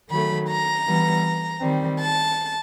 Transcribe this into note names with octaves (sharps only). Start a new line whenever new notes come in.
D#3 F#3 A3 B5
A#5
E3 G3 B3
D#3 G3 C4
A5